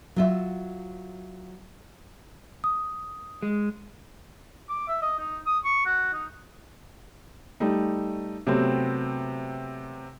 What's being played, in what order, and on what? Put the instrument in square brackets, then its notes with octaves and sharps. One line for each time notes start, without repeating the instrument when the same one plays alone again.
[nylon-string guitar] F#3 F4 E5
[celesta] D#6
[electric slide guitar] G#3
[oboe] D6
E5
D#5
D#4
D#6
C#6
F#4
D#4
[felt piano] G3 A3 D#4
C3 F#3 A3 B3 C4